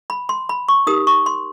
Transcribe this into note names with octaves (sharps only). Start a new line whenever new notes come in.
B5
C6
B5
C#6
D#4 G4 A#4 D#6
C#6
C6